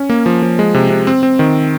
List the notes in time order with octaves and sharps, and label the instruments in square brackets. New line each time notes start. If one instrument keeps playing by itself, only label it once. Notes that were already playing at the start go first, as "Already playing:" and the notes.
Already playing: [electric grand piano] C#4
A#3
F3
F3
G#3
C3
C3
C4
C4
D#3